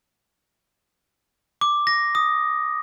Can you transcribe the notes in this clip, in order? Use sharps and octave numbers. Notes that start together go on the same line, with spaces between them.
D6
A#6
D#6